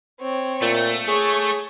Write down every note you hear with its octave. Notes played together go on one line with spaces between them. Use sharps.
C4 C#5
A#2 A3
G#4 C#5 C#6